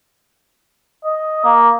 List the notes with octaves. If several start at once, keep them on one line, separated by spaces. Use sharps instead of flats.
D#5
A#3